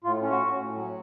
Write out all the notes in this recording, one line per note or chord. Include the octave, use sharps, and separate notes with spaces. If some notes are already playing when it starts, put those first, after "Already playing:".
A2 F4
C#4
F#4
A2
A2
F#3